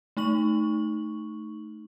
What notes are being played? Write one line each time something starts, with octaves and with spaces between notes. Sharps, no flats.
A3 D#4 C#6 F#7